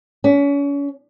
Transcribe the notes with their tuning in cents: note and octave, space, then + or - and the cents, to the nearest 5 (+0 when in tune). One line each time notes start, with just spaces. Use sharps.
C#4 +35